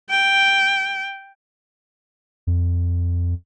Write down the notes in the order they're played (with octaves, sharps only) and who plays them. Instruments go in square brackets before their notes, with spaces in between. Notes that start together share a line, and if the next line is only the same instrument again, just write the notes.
[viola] G5
[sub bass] F2